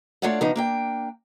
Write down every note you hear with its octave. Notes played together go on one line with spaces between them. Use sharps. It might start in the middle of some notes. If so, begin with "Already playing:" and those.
A3 D4 F4 C#5 D5 F#5
C#3 F3 B3 D4 D#4
A#3 D4 G5